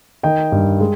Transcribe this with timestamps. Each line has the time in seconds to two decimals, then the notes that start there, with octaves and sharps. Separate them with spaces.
0.23 D#3 D#5 G5
0.52 G2
0.80 G#3